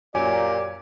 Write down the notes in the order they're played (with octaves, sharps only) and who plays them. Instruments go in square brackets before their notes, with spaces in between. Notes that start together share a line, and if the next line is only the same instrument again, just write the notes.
[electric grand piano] F#2 C#5 G#5 [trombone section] A#2 [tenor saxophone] G4 [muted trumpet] D5